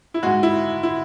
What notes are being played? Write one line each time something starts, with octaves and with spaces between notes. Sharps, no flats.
E4
G#2 G#3 F#4
E4
E4